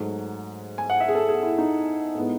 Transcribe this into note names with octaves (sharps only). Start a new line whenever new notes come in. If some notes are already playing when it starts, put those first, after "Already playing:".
Already playing: G#2 F#3 A3
G#5
F#5
E5
G#4
A4
G#4
E4
D#4
A2 G#3 B3